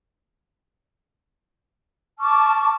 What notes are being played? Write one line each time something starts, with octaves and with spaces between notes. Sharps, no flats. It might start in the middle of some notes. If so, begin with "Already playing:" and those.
A5 C#6 D6 F6